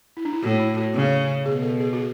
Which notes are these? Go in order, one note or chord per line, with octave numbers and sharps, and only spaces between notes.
E4
D4
E4
A2 F#4
E4
F#4
C#3
B2 G#4
A4
G#4
F#4
G#4